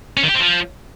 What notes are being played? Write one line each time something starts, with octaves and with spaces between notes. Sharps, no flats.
C#4
D#3
G4
C4
F3